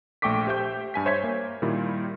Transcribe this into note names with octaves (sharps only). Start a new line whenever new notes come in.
A#1 A3 G5 C#6 D6 B6
G4 C5 E5 G5 G6
G2 G#5 B6
C5 C#5 E5 G6 G#6 B6
A#3
A#2 D#3 G3 E4 F4